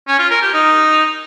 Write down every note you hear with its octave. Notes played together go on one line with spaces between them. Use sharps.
C#4
F4
A#4
G4
D#4